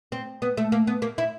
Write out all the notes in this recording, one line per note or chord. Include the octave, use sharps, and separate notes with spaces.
C4
B3
A3
A#3
B3
A#3
E4